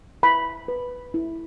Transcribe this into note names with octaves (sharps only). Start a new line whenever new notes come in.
E4 B5
B4
E4